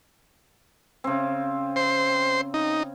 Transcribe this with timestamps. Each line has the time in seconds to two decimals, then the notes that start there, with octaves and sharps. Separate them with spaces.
1.04 C#3 C4
1.76 C5
2.54 D#4